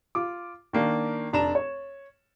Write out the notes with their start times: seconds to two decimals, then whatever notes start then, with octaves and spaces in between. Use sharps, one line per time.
0.15 F4 D6
0.73 D#3 A#3 D4
1.33 F1 D4 A#5 E7
1.55 C#5